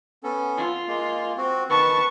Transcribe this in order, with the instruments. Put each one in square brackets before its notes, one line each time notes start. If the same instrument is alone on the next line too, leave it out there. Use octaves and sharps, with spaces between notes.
[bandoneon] B3 C#4 A4
[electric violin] F4
[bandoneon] G#3 A#3
C4 F#4
[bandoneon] D#3 B4 [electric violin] A5 C#6